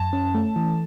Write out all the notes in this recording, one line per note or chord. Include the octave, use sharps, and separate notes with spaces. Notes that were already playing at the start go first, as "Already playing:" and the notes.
Already playing: F#2 A5
C#4
A3
E3